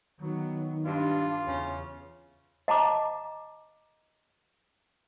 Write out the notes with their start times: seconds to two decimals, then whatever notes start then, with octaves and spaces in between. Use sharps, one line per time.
0.19 D#3 F#3 B3
0.86 G2 D4 F4
1.46 E2 C#3 C#4
2.68 D#5 A5 A#5 D6